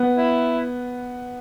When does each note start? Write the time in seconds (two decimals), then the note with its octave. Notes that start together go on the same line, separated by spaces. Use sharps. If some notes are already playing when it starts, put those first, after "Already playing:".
Already playing: B3
0.17 E4